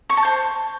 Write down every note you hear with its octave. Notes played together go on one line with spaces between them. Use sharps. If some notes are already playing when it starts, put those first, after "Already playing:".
C#6
A5
C5